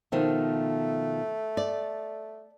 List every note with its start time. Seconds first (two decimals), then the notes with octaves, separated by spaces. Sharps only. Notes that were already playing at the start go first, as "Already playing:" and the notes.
0.12 B2 D#3 F3 A3
1.57 D5